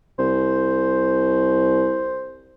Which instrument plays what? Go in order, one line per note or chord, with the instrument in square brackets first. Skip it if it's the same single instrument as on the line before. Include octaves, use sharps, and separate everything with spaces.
[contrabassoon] C2 [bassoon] C5